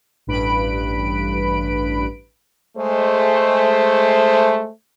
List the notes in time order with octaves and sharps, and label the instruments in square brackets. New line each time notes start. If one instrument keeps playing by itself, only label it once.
[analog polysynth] A1 G2 B4 B5 D7
[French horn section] G#3 A3 C5